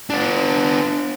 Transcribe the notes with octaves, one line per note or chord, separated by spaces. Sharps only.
B3 D4